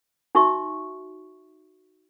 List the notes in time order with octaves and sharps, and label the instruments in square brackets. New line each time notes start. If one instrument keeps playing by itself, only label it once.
[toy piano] D#4 F#4 E5 C#6